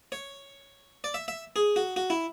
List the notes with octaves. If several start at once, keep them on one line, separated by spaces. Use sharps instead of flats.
C#5
D5
E5
E5
G#4
F#4
F#4
E4